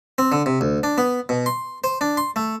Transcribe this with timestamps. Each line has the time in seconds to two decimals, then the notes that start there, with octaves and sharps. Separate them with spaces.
0.18 C4
0.32 D3
0.46 C3
0.61 D2
0.83 D4
0.98 B3
1.29 B2
1.46 C6
1.84 C5
2.01 D4
2.17 C6
2.36 A3